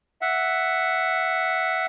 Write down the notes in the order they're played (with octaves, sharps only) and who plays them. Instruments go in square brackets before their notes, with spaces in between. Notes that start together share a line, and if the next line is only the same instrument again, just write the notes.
[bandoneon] E5 F#5